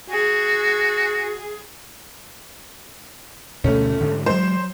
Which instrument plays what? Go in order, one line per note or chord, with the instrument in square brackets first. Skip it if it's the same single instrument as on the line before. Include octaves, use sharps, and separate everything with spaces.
[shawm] F#4 [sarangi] G#4
[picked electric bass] D2 B2 D3 [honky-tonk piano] A3 C#4
[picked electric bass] G#2 D3
[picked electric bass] F#3 G#3 [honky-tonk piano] C5